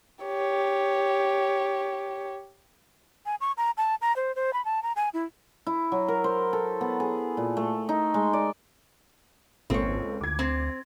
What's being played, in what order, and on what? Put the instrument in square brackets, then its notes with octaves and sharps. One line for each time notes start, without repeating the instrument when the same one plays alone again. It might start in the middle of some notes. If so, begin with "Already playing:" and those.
[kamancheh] G4 C#5
[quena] G#5
C#6
A#5
A5
A#5
C5
C5
B5
A5
A#5
G#5
E4
[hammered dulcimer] E4
F#3
A#4
C5
A4
B3
G#4
A#2
A3
D#4
G#3
D5
[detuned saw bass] G#1 [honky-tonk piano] C#2 A#3 A4 [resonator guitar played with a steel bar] C4 C#5
[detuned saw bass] D2 [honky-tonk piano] D6 G#6
[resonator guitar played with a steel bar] C4